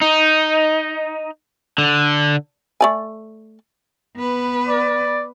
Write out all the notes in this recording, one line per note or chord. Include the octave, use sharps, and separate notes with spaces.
D#4
D3
A3 D5 G#5
B3 B4
D5